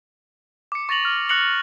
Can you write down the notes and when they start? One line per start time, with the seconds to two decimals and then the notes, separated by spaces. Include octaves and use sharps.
0.72 D6 C#7
0.89 C#6 A6 A#6 F7 F#7
1.05 F6
1.29 D6 F#6 A#6 C#7 F7 F#7